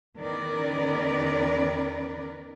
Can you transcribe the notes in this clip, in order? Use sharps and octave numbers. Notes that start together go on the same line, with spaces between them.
E2 D#3 C#4 A#4 B4 D5